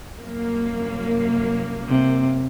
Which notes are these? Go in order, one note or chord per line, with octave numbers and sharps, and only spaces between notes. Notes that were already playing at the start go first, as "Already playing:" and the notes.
C2 F#2 A#3
C3